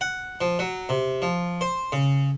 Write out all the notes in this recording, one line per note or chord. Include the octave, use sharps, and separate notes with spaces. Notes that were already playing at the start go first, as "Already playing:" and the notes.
F#5
F3
F#3
C3
F3
C5
C#3